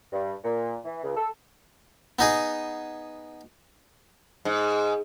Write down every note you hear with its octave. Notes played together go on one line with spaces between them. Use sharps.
G2
A#2
E3
C#2
A4
B3 D#4 G#4
G#2